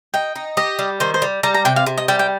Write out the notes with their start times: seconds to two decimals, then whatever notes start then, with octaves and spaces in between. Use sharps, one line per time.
0.14 D#4 G5
0.35 D#4
0.57 G4 D#5
0.79 G3
1.00 D#3 C5
1.14 C5
1.22 G3
1.43 G3 A#5
1.54 A#5
1.65 C3 G5
1.76 F5
1.87 C3
1.98 D#5
2.08 G3 G5
2.19 G5